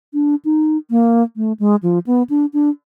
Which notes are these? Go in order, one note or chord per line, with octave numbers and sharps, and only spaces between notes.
D4
D#4
A#3
A3
G#3
F3
B3
D4
D4